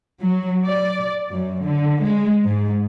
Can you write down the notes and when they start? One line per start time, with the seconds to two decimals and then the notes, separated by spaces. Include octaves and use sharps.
0.21 F#3
0.64 D5
1.32 F#2
1.64 D3
2.02 G#3
2.45 G#2